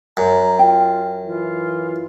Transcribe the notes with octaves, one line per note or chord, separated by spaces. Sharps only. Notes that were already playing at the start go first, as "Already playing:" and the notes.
F#2 A#5
F4 G5
E3 F4